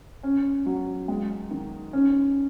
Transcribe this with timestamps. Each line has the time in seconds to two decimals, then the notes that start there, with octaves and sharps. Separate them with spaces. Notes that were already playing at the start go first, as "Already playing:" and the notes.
0.23 C#4
0.66 F#3
1.08 G#3
1.51 D#3
1.93 C#4